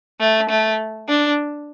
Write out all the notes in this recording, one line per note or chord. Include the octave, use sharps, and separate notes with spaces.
A3
A3
D4